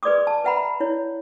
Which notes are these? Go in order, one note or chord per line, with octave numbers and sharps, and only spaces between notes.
G#4 B4 D5 C6 D6 D#6
A5
B4 E5 F#5 A#5 B5
E4 C#5